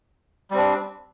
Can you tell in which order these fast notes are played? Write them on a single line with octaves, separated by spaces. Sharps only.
G3 C4 D4